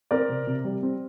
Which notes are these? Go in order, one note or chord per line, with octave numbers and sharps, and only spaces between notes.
C4 A#4 D5
C3
C3
G3
C4